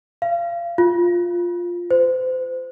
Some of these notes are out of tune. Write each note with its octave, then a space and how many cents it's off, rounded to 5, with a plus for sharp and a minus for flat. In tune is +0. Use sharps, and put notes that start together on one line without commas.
F5 -30
F4 +5
C5 -35